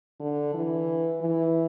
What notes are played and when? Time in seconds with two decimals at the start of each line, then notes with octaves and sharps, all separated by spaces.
0.20 D3
0.54 E3
1.21 E3